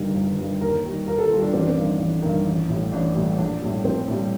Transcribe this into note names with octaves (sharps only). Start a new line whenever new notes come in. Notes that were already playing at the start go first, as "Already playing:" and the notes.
Already playing: G1 G2 D#3 G3
G1
G2 D#3 G3
D#2 A#4
D#3 G3
D#2 A#4
A4
D#3 G3 F4
D4
A1 C4
D4
C4
G2 D#3
A1
G2 D#3
A1
A2 G3
A1 D4
A2 G3
A#1 D4
A2 G3
A#1 C4
A2 G3